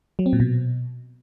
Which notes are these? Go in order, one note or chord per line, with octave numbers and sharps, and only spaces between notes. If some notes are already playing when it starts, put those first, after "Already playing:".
F#3
C4
A#2
B2